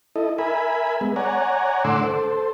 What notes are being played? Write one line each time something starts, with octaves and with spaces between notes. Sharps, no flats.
E4 A4 D#5
A#4 E5 G#5 B5
G#3 B3
C#5 D5 F#5 G#5 A#5
A2 D3 F#5 C6 D6 E6
A4 C5